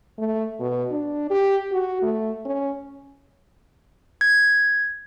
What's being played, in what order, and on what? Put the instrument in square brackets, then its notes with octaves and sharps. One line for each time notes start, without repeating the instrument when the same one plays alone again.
[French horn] A3
B2
D4
G4
F#4
A3
C#4
[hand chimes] G#6